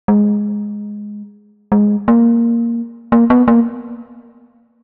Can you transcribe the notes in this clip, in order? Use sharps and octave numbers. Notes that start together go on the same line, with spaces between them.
G#3
G#3
A#3
A#3
B3
A#3